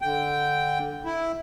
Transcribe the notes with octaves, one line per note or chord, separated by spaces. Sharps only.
D3 G5
E4